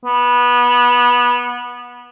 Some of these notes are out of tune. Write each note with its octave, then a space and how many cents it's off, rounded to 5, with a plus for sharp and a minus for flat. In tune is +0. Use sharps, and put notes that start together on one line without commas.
B3 -20